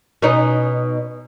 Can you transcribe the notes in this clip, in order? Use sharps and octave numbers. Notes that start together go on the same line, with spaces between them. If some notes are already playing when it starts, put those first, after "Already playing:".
B2 C#4 D#4